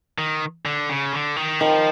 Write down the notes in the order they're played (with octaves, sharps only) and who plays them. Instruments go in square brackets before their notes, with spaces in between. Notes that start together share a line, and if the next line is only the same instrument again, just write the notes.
[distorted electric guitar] D#3
D3
C#3
D3
D#3
[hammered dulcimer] D#3 [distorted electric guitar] F3